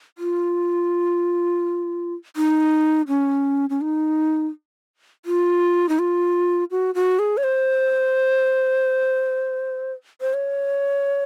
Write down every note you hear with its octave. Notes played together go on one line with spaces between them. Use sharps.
F4
D#4
C#4
C#4
D#4
F4
D#4
F4
F#4
F#4
G#4
C#5
C5
C5
C#5